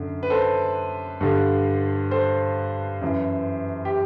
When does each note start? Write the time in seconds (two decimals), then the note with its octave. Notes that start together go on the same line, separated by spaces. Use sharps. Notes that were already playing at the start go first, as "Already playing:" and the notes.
Already playing: F#2 D3
0.23 B4
0.30 A4 C5
1.21 G2 D3
2.11 A4 C5
3.01 F#2 E3
3.85 G4